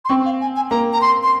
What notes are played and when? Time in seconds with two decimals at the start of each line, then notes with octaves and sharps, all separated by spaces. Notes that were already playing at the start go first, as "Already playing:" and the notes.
0.05 C6
0.09 C4 C#6
0.26 F5
0.41 G#5
0.56 G#5
0.71 A#3 A#5
0.93 A#5
1.01 C6
1.23 C6